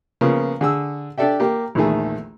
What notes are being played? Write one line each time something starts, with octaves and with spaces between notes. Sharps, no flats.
C#3 F3 A#3 B3
D3 G#4 E6
D4 G4 A4 D5 E5 G5
A#3 G4
A#1 E2 D#3 A3 G#4